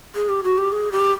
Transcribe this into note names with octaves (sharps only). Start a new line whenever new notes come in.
G#4
G4
F#4
G4
G#4
G4